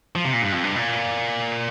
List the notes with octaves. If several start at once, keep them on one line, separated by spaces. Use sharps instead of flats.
F3
C3
A#2
G2
F2
G2
A#2